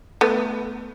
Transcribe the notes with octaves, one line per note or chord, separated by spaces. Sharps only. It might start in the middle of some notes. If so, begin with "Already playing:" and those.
A3 B3